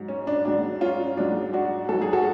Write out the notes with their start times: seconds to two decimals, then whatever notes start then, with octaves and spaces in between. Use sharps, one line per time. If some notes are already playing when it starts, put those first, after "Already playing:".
Already playing: G#2 F#3
0.08 C#4
0.27 D4
0.45 G#2 F#3 D4
0.81 C#4 F4
1.17 G#2 F#3 D4
1.53 D4 F#4
1.89 G#2 F#3 A4
2.02 G#4
2.13 F#4 A4